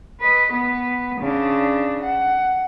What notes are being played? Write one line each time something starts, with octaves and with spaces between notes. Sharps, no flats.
B4 D#5
B3 B4
C#3 D4
F#5